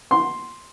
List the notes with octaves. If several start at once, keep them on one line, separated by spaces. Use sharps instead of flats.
C6